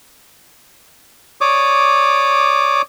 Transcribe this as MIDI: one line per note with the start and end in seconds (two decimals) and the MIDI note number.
1.41 2.82 73
1.41 2.82 74
1.41 2.82 86
1.41 2.82 87